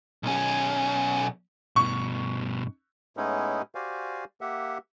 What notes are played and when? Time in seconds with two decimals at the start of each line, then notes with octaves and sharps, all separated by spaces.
0.23 B1 C#4
1.76 G2 B2 C#6
3.17 A2 G#3 B3 C#4 D#4 E4
3.75 F#4 G4 C5 D5 F5 G#5
4.41 A#3 G4 E5 F#5